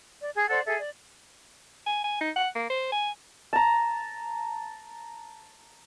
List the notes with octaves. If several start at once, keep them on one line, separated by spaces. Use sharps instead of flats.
D5
G#4 G#5 G#6
A4 C5 D5 F#5
G#4 A4 E5
D5
G#5
G#5
D#4
F#5
A#3
C5
G#5
A5 A#5